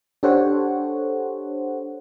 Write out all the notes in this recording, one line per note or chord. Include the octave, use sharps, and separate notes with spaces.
D4 G4 A4 C5 C#5 F#5